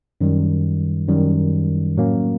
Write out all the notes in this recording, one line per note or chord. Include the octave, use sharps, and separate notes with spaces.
F#2 D#3 G3
F#2 D#3 G3
A2 F#3 A#3 C#4